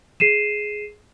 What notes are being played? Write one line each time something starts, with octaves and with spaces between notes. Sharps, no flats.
G#4 C7 D#7 E7